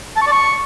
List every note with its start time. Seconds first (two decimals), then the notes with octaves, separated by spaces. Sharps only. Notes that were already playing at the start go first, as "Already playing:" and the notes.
0.16 A5
0.21 C#6
0.27 D5
0.32 C#6